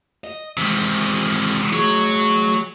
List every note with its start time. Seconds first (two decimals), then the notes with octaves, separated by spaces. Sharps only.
0.24 D#5
0.57 C3 D#3 E3 G#3
1.73 F#3 A3 G#4 C#5